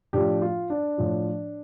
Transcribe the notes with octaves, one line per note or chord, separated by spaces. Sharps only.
A2 F3 D4 G4
F4
D4
A2 F3